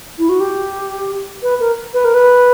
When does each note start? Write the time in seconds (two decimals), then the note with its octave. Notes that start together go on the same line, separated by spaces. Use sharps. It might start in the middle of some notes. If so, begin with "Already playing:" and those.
0.19 E4
0.29 F#4
0.40 G4
1.43 B4
1.60 A#4
1.94 B4
2.05 A#4
2.14 B4